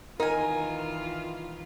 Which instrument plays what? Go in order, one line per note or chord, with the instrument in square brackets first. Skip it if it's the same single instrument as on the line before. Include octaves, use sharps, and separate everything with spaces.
[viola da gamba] D#3 E3 F4 [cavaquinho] D#4 G#5 [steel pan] A#4